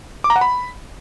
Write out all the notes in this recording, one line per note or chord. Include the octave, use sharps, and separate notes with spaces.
D6
A#5
F#5
B5